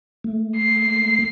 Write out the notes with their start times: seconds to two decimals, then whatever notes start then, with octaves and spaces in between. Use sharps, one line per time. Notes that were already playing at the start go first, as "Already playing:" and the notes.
0.24 A3
0.57 C7